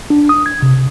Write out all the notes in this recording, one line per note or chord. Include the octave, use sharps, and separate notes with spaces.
D4
D#6
G#6
C3